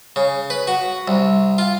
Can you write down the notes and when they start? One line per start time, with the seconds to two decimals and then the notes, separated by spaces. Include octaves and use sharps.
0.16 C#3
0.50 B4
0.67 F#4
1.08 C2
1.58 F4